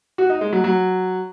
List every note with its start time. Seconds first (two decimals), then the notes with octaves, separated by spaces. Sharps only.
0.18 F#4
0.30 D#4
0.41 G#3
0.53 F#3
0.64 F#3